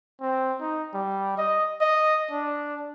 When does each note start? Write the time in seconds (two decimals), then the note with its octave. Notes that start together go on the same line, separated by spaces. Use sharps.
0.21 C4
0.61 D#4
0.94 G3
1.38 D#5
1.81 D#5
2.31 D4